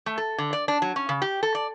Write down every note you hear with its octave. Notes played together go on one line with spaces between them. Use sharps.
A3
A4
D3
D5
D4
F#3
C#4
C#3
G4
A4
D5